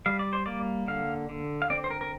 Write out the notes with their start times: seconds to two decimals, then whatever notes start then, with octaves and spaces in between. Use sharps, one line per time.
0.06 G3 F5
0.19 D5
0.33 C5
0.46 A#3 D5
0.88 D3 F5
1.29 D3
1.62 F5
1.70 C4 D5
1.84 C5
1.90 A#4
2.01 A#4